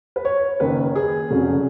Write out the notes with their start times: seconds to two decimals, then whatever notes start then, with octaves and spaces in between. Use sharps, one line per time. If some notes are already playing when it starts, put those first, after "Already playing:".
0.16 B4
0.25 C#5
0.60 F#1 F#2 D#3 A#3 B4
0.95 G#4
1.30 F1 F2 C#3 F#3